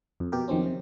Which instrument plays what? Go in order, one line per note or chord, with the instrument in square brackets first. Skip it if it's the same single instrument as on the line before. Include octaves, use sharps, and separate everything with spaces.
[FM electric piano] F2
B2 G4 A#4
F2 D#3 F#3 C4 C#4
C3